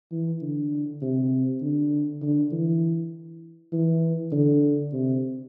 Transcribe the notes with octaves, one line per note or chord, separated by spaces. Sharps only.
E3
D3
C3
D3
D3
E3
E3
D3
C3